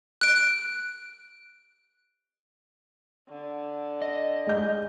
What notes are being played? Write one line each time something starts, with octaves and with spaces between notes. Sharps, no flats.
F#6 D7
D3
D#5
G#3 G6